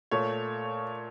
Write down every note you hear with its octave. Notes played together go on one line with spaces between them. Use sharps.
A#2 A3 C#5